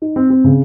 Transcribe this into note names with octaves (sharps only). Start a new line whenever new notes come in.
D#4
C4
C4
C#3